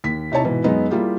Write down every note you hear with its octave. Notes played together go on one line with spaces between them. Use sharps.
D#2 B6
C3 D#4 E4 C#5 A5
G#2 B2 E3
F#2 G#3 B3 D#4
G3 A#3 E4 F4 G4 G#4